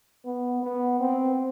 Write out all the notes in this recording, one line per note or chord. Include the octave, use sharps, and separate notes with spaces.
B3
B3
C4